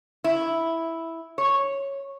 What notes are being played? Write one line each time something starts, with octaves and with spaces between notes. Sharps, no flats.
E4
C#5